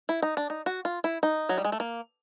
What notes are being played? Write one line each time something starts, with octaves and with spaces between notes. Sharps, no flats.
E4
D#4
D4
D#4
F#4
F4
E4
D#4
F#3
G3
G#3
A3
A#3